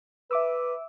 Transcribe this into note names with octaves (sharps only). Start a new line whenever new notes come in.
B4 E5 D6 E6